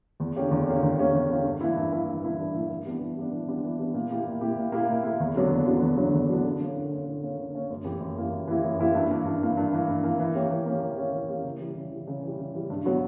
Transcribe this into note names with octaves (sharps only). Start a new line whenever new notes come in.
E2
D3 A#3 C#4 G4
E2
D3 A#3 C#4 G4
E2
D3 A#3 C#4 G4
E2
D3 A#3 C#4 G4
G2
E3 A#3 E4
G2
E3 A#3 E4
G2
E3 A#3 E4
G2
E3 A#3 E4
E3
G3 B3 D4
E3
G3 B3 D4
E3
G3 B3 D4
E3
G3 B3 D4
A#2
A#3 E4 G4
A#2
A#3 E4 G4
A#2
A#3 E4 G4
A#2
A#3 E4 G4
E2
D3 F#3 B3 D4
E2
D3 F#3 B3 D4
E2
D3 F#3 B3 D4
E2
D3 F#3 B3 D4
D3
A#3 C#4
D3
A#3 C#4
D3
A#3 C#4
D3
A#3 C#4
F#2
E3 A#3 E4 G4
F#2
E3 A#3 E4 G4
F#2
E3 A#3 E4 G4
F#2
E3 A#3 E4 G4
G2
E3 A#3
G2
E3 A#3
G2
E3 A#3
G2
E3 A#3
E3
A#3 C#4 G4
E3
A#3 C#4 G4
E3
A#3 C#4 G4
E3
A#3 C#4 G4
C#3
E3 G3
C#3
E3 G3
C#3
E3 G3
C#3
E3 G3
G2
F#3 B3 F#4